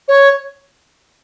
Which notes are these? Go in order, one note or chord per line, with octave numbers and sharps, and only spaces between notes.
C#5